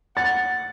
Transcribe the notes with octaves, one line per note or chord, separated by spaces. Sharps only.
F#5 A6